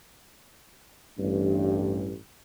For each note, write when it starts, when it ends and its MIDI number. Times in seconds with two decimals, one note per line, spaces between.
1.19 2.15 33
1.19 2.15 43